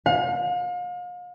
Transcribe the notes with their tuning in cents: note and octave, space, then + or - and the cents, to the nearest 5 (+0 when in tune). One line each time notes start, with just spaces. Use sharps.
F5 +40